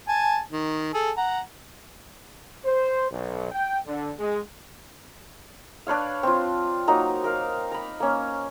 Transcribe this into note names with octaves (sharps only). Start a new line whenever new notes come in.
G#5 A5
D#3
G#4 A4
F#5 A#5
C5
B1
G5
D3
G#3
D4 B4 C#5 F5
C4 F4
F#3 A#3 D#4 A#5
A#4 F5
A#5 B5
A#3 C#4